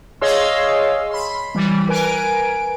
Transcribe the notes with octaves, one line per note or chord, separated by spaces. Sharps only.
G#4 C#5 D#5 F5 C6 E6
B5 C6
E3 G3
A#4 B4 G#5 D7